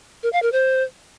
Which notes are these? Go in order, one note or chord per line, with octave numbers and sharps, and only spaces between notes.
A#4
F5
A#4
C5